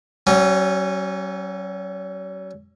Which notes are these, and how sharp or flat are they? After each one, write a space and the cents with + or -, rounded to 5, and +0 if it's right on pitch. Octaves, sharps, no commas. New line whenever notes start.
F#3 +40 C#4 -20